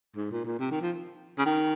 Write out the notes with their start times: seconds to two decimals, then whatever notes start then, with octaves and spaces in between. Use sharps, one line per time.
0.16 G#2
0.31 A#2
0.45 A#2
0.59 C3
0.71 D#3
0.81 F3
1.38 C#3
1.46 D#3